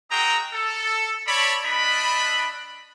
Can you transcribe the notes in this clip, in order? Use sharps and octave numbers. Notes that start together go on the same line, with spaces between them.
C4 F#4 G#4 D#5 G5 A#5
A4
A4 C#5 D5 A5 B5
A3 D4 D#5 B5